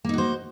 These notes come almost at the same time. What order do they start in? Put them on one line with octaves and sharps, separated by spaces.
A#3 D#4 F#4 C5